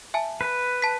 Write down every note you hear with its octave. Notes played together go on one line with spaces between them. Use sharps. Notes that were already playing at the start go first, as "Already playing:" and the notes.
E5 G#5 A5
B4
A5 B6